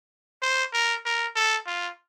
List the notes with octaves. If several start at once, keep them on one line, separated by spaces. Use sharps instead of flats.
C5
A#4
A#4
A4
F4